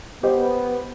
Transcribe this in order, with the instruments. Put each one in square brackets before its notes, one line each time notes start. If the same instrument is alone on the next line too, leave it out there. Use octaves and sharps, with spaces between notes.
[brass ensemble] B3 [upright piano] G4 C5 D#5